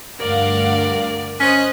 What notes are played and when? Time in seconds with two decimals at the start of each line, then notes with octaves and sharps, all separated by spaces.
0.19 D2 G2 A#4 D5 F5 F#5
1.40 C#4 C5 D#5 F#6